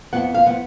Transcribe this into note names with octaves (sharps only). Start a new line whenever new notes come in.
F2 F3 B3 F#5
F5
F3 B3 F#5